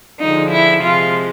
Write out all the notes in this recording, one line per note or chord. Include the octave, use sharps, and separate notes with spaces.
D3 F3 G#3 D#4
E4
C3 F3 G#3 F4